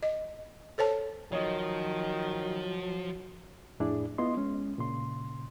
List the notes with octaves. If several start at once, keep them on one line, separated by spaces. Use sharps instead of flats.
D#5
A4 C5 C#5 A5
D#3 F3 F#3 C#5 D#5
F2 A2 D4 E4 G#4 D5
B3 E4 F4 D#5 C6
G#3 C#4
A#2 C#3 C6